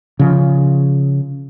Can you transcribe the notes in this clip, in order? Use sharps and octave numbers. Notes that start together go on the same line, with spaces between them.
C#3 F3